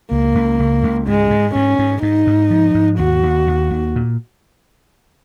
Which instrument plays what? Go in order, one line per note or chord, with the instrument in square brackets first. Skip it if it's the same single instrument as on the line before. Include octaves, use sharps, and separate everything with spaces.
[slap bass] C#2 [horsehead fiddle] A#3
[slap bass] C#2
C#2
C#2
[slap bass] G#2 [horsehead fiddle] G#3
[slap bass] G#2
[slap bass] G#2 [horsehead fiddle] C#4
[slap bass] G#2
[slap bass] G#2 [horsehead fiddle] D#4
[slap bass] G#2
F3
G#2
[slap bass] D#2 [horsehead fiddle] F#4
[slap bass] D#2
D#2
D#2
A#2